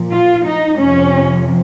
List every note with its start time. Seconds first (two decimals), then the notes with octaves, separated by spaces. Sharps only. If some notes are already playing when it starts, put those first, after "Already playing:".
Already playing: A#2 F3
0.11 F4
0.46 D#4
0.79 F2 C3 F3 C#4